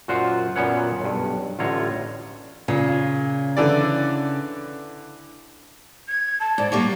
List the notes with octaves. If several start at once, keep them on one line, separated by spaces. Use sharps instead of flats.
F#2 A#2 F4 F#4 C5 F#5
F#2 A#2 B3 C#4 C#5 F#5
B1 G2
A1 A2 D3 F4 C#5 A#5
A#2 C#3
D3 E3 D5
G#6
A5
G#2 D5
F#3 G3 A#3 D6